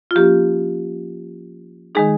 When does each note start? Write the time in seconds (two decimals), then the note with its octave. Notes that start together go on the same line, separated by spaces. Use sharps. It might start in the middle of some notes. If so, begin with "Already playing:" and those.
0.11 F4
0.15 F3 A#3 C#4 G4
1.95 D#3 G#3 D#4 G#4